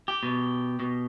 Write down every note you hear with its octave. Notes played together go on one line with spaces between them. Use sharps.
G4
B2
B2